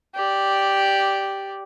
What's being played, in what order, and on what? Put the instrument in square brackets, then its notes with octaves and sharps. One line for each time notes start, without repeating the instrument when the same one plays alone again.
[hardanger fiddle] G4 D5